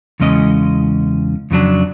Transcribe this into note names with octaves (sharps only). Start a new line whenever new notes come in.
E2 C#3 G#3 C#4 D#5
F2 C#3 F#3 D4